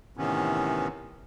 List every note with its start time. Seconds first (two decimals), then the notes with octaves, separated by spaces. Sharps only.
0.17 A2 C3 D#3 E3 B3 C#4